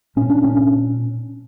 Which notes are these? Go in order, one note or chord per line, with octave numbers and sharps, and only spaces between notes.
A#2 C#4
D4
C#4